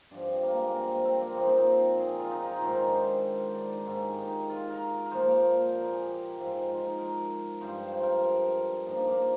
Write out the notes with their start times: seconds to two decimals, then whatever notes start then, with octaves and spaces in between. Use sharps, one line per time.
0.11 G2 F3 D4
0.28 C4
0.43 A#3
0.53 G#3
0.64 A#3
0.75 C4
0.89 C4
1.05 C4
1.21 A#3
1.36 A#2 F3 C4
1.47 D#4
1.58 C4
1.99 G#4
2.19 F4
2.31 D#4
2.40 F4
2.51 A#4
2.62 G#2 D#3 C5
2.72 C5
2.83 D4
3.55 D4
3.71 D#4
3.86 G#2 D#3 F4
4.02 G4
4.18 D#4
4.49 F4
4.70 A#4
5.06 A#4
5.11 A#2 F3 C5
5.75 A#4
5.84 G#4
5.94 G4
6.37 G#2 F3
6.68 F4
6.79 D#4
6.98 A#4
7.61 G2 F3 C5
7.93 C5
8.03 A#4
8.86 A#2 F3 D#4
8.97 D4
9.08 A#3